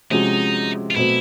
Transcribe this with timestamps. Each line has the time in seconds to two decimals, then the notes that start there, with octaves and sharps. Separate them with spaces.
0.11 C3 F3 G#3 C#4 D#4 F#4
0.91 F4
0.95 B2 F#3 A3 C4 E4